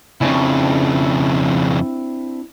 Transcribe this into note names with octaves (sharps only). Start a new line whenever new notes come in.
F2 C#3 C4 D4 E4